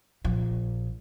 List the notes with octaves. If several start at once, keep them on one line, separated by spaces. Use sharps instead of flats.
A#1 F3